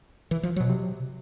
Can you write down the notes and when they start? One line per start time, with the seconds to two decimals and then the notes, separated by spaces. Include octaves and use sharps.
0.31 E3
0.43 F3
0.56 B2 F#3
0.69 C3